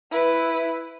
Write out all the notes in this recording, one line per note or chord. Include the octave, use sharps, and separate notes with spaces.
E4 B4